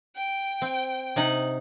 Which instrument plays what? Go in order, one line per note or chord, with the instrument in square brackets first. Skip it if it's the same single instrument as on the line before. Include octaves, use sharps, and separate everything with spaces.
[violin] G5
[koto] C4
C3 D#4 F#5